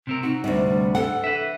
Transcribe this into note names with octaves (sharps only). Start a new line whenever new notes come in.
C3 C4 A#4
D#4 F#4
D2 C3 G3
A4 F#5
B4 E5